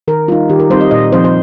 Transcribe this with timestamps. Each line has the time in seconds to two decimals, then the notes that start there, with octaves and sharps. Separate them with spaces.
0.08 D#3 A#4
0.28 G3 D#4 F4
0.49 D#3 G4
0.60 A#4
0.70 G3 C4 D#4 C5
0.81 D#5
0.91 A#2 D#5
1.12 F3 C4 D#4 C5
1.24 C5